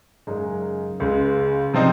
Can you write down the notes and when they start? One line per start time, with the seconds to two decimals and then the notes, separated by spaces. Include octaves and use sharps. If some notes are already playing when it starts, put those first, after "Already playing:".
0.27 F#2 C#3 G#3 D#4
1.00 C#2 C#3 G#3
1.74 C3 F3 C4 D#4